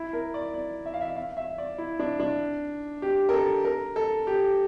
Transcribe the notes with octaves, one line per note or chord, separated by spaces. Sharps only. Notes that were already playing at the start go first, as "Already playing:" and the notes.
Already playing: E4
A#4
D5
D5
E5
F5
E5
F5
E5
D5
E4
D4
D4
G4
A#4
A4
A#4
A4
G4